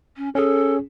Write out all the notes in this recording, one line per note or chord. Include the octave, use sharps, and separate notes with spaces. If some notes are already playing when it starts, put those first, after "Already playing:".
C#4
C#4 G#4 A4